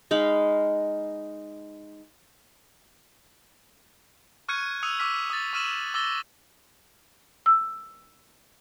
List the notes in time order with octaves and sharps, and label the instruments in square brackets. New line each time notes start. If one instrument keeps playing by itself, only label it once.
[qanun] G#3 D#4 F5 B5
[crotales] C#6 F6 F#6 G#6 C#7 D#7
D#6 E6 C#7 D#7 F7
C#6 D6 E6 F6 B6
D#6 A6
C#6 E6 F6 D#7 E7 F#7
D6 E6 A6 A#6 G7
[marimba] E6